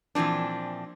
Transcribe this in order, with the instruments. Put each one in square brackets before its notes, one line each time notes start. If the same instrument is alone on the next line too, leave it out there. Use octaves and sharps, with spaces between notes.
[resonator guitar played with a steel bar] A#2 E3 F3 C4 D4